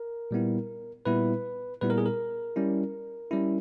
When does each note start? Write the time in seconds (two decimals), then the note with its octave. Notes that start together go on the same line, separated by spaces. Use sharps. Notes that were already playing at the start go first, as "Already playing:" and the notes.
Already playing: A#4
0.31 A#2 G3 B3 E4
1.05 A#2 G3 B3 E4 B4
1.81 A#2 G3 B3 E4 B4
1.90 A#4
1.98 G#4
2.06 A#4
2.56 G3 C#4 E4
3.31 G3 C#4 E4